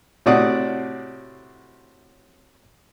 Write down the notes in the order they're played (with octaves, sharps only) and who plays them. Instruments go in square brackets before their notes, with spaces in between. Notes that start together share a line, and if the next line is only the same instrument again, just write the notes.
[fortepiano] A2 C3 F#4 D5 F#5 D#6